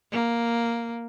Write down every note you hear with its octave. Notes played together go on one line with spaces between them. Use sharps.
A#3